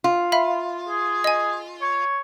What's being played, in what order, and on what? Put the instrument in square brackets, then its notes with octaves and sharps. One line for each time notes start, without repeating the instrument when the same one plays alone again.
[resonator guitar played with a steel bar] F4
[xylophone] E5 F5 B5
[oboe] G#4
[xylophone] D#5 G#5
[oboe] C#5